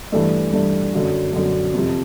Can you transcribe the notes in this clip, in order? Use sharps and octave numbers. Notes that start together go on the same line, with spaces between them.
G2 E3 A3 D4
G2 E3 A3 D4
F#2 D3 F#3
F#2 D3 F#3
F2 C3 F3